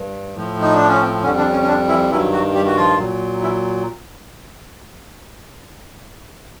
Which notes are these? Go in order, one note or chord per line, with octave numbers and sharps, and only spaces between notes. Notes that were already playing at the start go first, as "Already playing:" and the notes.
Already playing: G2
A2 F3
D#4
D4
C#4
C4
F2 D3 G3 C#4
D3 D4
C#4
C#4
D3 D4
E3 E4
G2 D#3 E3 F#3 E4
F#3 F#4
G3 G4
F#4
F3 F4
A#2 F#3
E3 E4